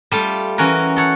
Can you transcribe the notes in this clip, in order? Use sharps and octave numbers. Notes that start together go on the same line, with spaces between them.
G3 A3 F4
E3 C#4 F#4 A#4
A4 C#5 F#5